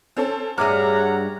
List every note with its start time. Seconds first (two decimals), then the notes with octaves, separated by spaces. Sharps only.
0.17 C4 C#4 A4
0.58 G2 G#4 C#5 E5 F#5 A#5 D6 F6